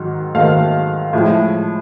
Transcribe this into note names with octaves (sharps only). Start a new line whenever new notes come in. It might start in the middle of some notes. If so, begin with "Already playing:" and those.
Already playing: G#2 D#3 F#3
G#2 D#3 F#3 A3 F5
A2 F3 G#3